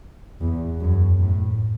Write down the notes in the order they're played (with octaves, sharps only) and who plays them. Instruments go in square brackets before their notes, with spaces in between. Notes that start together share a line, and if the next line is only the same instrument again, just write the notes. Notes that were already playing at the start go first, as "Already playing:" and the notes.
[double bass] E2
F#2
A2